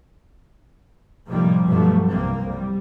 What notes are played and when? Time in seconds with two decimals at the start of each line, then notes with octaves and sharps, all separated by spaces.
1.27 A2 C3 D#3 F3 G3 A#3
1.66 G2 B2 D3 F3 F#3 A3
2.08 C2 A#3 C4
2.50 G3